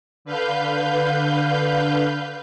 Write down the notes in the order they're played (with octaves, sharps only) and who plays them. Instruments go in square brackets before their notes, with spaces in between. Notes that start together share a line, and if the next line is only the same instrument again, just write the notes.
[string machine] D3 B4 F5 G6